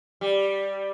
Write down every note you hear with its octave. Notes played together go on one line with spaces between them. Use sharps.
G3